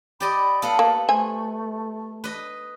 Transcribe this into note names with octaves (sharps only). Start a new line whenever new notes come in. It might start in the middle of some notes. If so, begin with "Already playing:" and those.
G4 D5 D#5 B5
B3 A4 F5
A#3
A3 C5 E5 G#5
B4 D#5